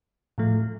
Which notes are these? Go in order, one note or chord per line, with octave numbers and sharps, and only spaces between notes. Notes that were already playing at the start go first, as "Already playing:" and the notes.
A2 F3 A3